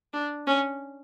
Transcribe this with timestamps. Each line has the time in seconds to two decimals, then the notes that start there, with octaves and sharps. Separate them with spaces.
0.13 D4
0.47 C#4